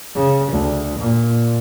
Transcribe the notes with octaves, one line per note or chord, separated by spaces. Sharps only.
C#3
D2
A#2